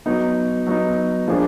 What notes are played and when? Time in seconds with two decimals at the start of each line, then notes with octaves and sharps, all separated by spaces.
0.06 F#3 B3 D#4
0.67 F#3 B3 D#4
1.28 F3 A#3 D4 G#4